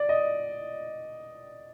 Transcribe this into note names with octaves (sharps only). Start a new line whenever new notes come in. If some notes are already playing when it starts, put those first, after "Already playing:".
Already playing: D5
D#5